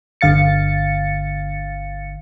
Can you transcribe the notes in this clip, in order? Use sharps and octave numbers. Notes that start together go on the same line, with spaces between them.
G1 D3 F5 A6 C#7